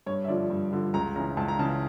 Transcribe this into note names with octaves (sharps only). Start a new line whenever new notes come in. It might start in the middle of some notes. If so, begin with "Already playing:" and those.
G2 C#5
E5
D3 F3 D5
G2
D3 F3
C#2 A#5
C#3 E3 A#5
C#2 A5
A#5
C#3 E3 A5